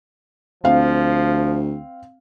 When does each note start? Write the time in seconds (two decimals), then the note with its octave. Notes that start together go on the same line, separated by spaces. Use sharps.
0.64 D2 F3 C4 F5